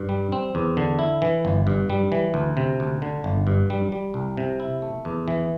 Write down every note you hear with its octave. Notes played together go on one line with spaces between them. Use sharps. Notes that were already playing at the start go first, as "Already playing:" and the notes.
Already playing: G2
G3
C4
E2
D3
E4
E3
G1
G2
G3
E3
D2
C3
D2
D3
G1
G2
G3
G3
C2
C3
E4
A3
E2
E3